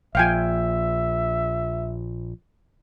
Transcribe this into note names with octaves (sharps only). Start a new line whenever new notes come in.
A#1 F3 E5 F5 G5 G#5